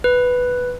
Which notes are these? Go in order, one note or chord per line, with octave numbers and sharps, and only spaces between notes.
B4